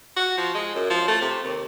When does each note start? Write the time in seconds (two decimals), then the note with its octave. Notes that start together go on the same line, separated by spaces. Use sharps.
0.16 F#4
0.38 F3
0.54 G#3
0.75 F#2
0.90 F3
1.08 A3
1.21 C3
1.43 D#2